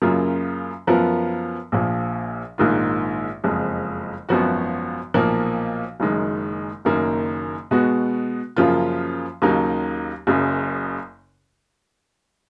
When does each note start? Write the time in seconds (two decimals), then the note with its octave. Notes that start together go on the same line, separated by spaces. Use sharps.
0.02 F#2 C#3 F#3 A#3 F4
0.87 F#2 F3 B3 F4 A#4
1.72 A#1 A#2 F3
2.58 A#1 G#2 D#3 A#3 F4
3.44 F#1 F2 F3 G#3
4.29 G#1 F#2 F3 B3 F#4
5.14 B1 A#2 F3 A#3
6.00 F#1 F#2 D#3 G#3
6.85 F#1 F#2 D#3 A#3
7.71 B2 G#3 B3 F#4
8.56 F#2 C#3 F3 A#3 F4
9.42 D#2 C#3 F#3 A#3 D#4
10.27 F#1 F#2 C#3